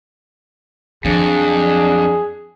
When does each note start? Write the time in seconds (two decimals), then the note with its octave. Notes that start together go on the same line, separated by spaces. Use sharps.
1.05 F2 F3 F#3 D4 G#4